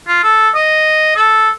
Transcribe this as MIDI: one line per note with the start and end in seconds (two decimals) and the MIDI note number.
0.07 0.19 65
0.23 0.49 69
0.55 1.11 75
1.16 1.49 69